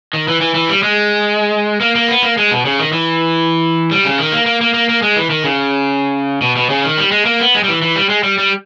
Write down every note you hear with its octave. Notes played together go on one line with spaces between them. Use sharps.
D#3
E3
E3
E3
G3
G#3
A#3
A#3
B3
A#3
G#3
B2
C#3
D#3
E3
G3
C#3
D#3
A#3
A#3
A#3
A#3
A#3
G#3
E3
D#3
C#3
B2
B2
C#3
D#3
G3
G#3
A#3
B3
G#3
G3
E3
E3
G3
G#3
G3
G3